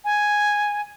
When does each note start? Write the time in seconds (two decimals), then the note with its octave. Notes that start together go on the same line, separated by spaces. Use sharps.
0.05 G#5